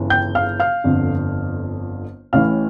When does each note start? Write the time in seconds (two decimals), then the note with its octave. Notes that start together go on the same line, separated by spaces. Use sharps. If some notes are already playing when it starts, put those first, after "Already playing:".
Already playing: G1 C#3 E3
0.10 G5 G6
0.35 F5 F6
0.60 F5 F6
0.84 G1 F2 D3
2.33 A1 A2 E3 F5 F6